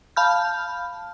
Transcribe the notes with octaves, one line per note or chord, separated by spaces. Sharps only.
F5 A5 B5 F6 G6